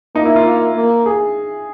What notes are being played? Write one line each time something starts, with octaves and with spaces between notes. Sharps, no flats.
A#3 D#4
E4
F4
A#3
G#4